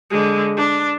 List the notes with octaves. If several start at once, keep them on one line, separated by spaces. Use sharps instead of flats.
D3 G#3
D4